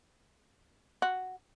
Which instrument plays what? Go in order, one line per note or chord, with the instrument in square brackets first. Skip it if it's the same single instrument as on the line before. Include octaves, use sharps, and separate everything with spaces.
[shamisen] F#4